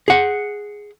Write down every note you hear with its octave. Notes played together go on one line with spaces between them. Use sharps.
G#4 F#5